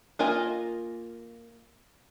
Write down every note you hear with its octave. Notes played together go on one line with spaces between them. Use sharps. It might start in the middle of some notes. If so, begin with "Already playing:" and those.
A#3 F4 A#4 D#5 G#5